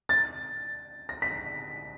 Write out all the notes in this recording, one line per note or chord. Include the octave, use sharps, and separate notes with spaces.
A6
A#6
B6